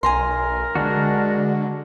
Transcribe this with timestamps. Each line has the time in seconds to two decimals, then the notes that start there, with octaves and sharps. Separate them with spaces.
0.03 B1 A#4 G#5 A#5 C6
0.75 D3 G#3 D4 F#4